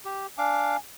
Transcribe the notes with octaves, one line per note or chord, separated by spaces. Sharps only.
G4
D4 F5 G#5 D6